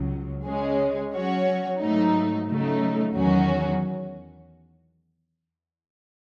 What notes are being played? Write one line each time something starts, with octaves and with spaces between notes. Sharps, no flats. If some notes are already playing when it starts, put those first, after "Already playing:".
Already playing: C#2 C#3 F#3
C#3 G#3 C#4 G#4
F#3 C#4 F#4 C#5
G#2 F#3 A3 D#4
C#3 F#3 A3 D#4
E2 D#3 F#3 C#4 F#4